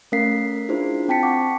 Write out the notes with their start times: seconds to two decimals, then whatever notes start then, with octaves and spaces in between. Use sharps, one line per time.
0.12 A3 C#4 A#4 F5 B6 C7
0.69 D4 E4 F4 G#4 C5
1.08 C4 G5 A5 B6 C#7
1.23 F#5 G5 A5 C#6 D6